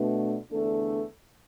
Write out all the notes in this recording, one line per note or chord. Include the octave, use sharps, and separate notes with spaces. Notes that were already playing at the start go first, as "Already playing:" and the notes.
Already playing: B2 A3 D4
E2 D3 A3 D4 A4